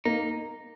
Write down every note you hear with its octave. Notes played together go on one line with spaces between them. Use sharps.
A#3 D#4